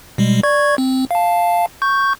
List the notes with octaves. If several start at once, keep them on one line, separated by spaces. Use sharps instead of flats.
B2 G3 G#3
D5 C#6 G#6
C4
F5 A5
C#6 G6